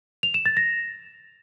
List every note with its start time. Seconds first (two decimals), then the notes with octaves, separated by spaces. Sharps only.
0.23 F7
0.34 E7
0.46 A6
0.57 A#6